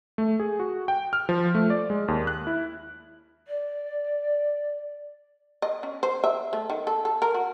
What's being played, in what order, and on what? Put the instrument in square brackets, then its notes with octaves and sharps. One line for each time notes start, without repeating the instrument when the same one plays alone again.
[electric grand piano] A3
G#4
F#4
G5
F6
F3
A3
D5
G#3
D#2
F#6
E4
[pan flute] D5
[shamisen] D#5
C#4
C5
E5
A3
D#3
A4
A4
A#4
F#4